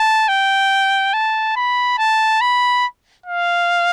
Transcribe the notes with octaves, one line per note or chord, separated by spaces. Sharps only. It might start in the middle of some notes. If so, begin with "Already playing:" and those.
Already playing: A5
G5
A5
B5
A5
B5
F5